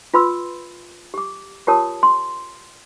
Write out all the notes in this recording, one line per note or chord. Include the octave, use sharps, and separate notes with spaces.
F4 B4 B5 C6 E6
G4 D6
F4 G4 A#4 C#5 A5 D#6
C6